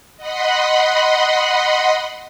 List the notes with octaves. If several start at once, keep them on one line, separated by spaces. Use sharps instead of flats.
D#5 F#5 B5 C6